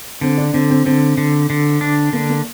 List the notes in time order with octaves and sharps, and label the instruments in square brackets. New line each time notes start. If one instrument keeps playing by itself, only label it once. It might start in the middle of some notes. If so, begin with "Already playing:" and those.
[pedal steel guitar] D3 [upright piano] C4
[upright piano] D4
[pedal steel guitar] D3 [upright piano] C4
[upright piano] C4
[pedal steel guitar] D3 [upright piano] C4
[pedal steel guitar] D3
D3
D4
[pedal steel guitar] D3 [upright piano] A#3
[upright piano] A#3